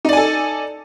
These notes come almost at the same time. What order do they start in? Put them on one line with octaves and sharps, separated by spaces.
D#4 D5 G#5 A4